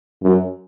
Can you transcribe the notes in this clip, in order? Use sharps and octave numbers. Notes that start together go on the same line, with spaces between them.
F#2